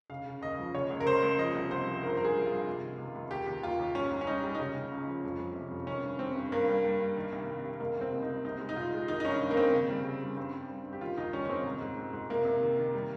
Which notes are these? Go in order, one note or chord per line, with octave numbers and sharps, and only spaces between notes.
C#3 F5
C#3
D#2 D#5
F3
C#3 C#5
C#2
A#4
C#2 C5
C#2
F3 D#5
C2
C2 C5
F3
G2 A#4
C5
G2 A#4
G#4
F3
G2 F4
C3
D#3
C#2
C#2
D#2 G4
D#2
D#2 F4
D#2
G#2 C#4
G#2
C#4
G3 D#4
G3
D#4
C#3 C#4
C#3
C#2
F3
F2
F2
C3
F2
D#3 C#4
G2
G3 C4
G2
G2 A#3
G3
G3
G2
D#3
C2
C2
C2
C#2 A#3
C#2 C4
C#2
D#4
C#2
C2 D#4
G#3
D#4
A#2 F4
G#3
D#3 D#4
D#4
G2 C#4
G2
A#3
D#3 C4
C#3
G3
C#3
G3
G2 C4
G2
G2
G2
G4
D#3 F4
D#2 D#4
G3 C#4
C#4
D#2 C4
G#2
G#2
G#2
G#2
C3 A#3
C3
D#3
D#3
G3